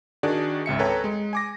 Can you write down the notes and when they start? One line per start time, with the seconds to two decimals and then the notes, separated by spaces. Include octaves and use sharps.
0.23 D#3 D4 F#4 G#4 D5
0.66 G#1 C#2 E5 C#7
0.79 A4 B4 C#5 G5 G#5 A#5
1.04 G#3
1.33 G#5 D6 A#6